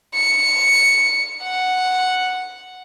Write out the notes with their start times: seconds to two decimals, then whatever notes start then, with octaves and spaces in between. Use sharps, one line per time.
0.14 C#7
1.43 F#5